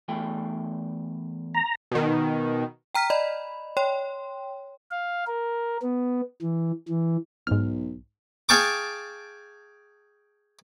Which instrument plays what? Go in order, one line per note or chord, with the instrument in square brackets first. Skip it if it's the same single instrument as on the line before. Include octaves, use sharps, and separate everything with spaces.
[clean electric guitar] E2 A3 G5
[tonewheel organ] A#5
[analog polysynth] B2 D#3
[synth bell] G5 A#5 F6 B6
D5 D#5 B5
C#5 G5 C6
[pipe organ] F5
A#4
B3
E3
E3
[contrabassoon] B1 [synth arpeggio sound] G#2 F6
[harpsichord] G#4 F5 G5 A5 C#6 D6